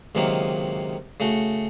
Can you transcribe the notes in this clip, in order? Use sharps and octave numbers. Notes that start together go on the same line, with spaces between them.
C#2 C3 D#3 F#3 A#3
C#3 A3 F#4